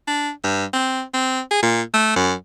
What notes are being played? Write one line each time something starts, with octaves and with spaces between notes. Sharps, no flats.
D4
G2
C4
C4
G#4
A#2
A3
F#2